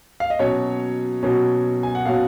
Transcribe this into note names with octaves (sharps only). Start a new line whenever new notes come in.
F5
D#5
B2 F#3 C#4 C#5
B2 F#3 C#4
G#5
F#5
B2 F#3 C#4 F5